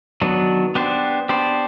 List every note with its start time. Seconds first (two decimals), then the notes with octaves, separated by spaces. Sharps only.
0.22 D#3 F#3 B3 D4
0.75 B3 D4 G4 C5
1.29 B3 D4 G4 C5